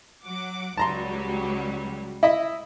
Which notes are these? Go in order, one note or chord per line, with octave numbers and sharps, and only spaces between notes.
F#3 F#5 D6
C#2 F#3 G3 A5 A#5 C6
E4 D#5 E5